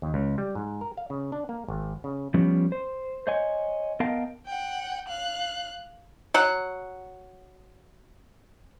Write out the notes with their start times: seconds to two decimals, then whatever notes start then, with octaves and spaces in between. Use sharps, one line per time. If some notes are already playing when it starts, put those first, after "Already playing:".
0.02 D#2
0.14 C#2
0.38 G3
0.55 G#2
0.81 A#4
0.97 F5
1.10 C#3
1.32 D4
1.49 A#3
1.68 G#1
2.04 C#3
2.34 F3 G3 B3 C#4
2.72 C5
3.27 C5 C#5 D#5 F#5 G#5
4.00 B3 A#4 D#5 F5 G5 A5
4.46 F#5 G5
5.08 F5 F#6
6.34 F#3 F#5